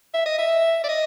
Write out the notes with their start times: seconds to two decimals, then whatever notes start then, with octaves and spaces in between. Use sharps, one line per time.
0.14 E5
0.26 D#5
0.38 E5
0.84 D5
0.89 D#5